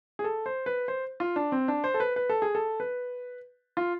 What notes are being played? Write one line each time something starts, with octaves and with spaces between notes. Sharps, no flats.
G#4
A4
C5
B4
C5
F4
D4
C4
D4
C5
A4
B4
B4
A4
G#4
A4
B4
F4